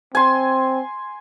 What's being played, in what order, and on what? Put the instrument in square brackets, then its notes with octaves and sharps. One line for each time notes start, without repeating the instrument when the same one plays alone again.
[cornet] C4 [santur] G#5 C6